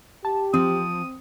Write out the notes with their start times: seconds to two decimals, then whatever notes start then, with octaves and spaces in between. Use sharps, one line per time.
0.25 G4 A5
0.54 F3 C4 D#6